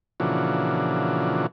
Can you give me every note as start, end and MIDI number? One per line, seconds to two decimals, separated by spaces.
0.20 1.46 46
0.20 1.46 49
0.20 1.46 52
0.20 1.46 53
0.20 1.46 62
0.20 1.46 66